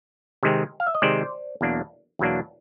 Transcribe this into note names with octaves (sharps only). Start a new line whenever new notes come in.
C3 D#3 G#3 C4
F5
E5
D#5
C3 D#3 G#3 C4 C5 D5
E2 B2 F#3 A#3 D4
E2 B2 F#3 A#3 D4